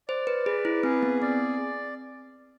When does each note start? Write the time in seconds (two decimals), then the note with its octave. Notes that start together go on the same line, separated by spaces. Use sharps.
0.08 C5 D5
0.27 B4
0.46 G#4 B4
0.65 E4
0.83 C4 G#4
1.03 B3
1.22 C4 D5